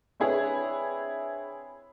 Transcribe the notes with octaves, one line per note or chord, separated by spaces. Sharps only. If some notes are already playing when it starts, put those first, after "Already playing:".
C4 D4 E4 G#4 B4 C#5